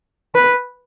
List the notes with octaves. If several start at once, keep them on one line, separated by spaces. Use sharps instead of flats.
B4